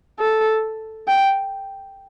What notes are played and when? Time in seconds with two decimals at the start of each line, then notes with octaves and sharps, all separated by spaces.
0.20 A4
1.08 G5